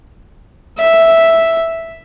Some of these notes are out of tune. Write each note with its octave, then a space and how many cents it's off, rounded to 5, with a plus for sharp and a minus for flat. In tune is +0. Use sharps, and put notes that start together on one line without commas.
E5 +0